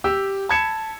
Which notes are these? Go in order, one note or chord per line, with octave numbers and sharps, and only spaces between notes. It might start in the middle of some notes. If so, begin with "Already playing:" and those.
G4 G5 E6
A5 B5 G#6 C#7 E7